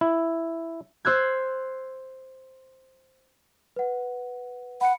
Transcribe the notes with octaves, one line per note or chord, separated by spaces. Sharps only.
E4
C5 E6 F#6 G#6
B4 F#5
F#5 B5 C#7